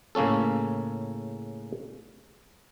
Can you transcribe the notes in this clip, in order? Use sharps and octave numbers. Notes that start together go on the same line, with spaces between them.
A2 C#3 A#3 C#4 A4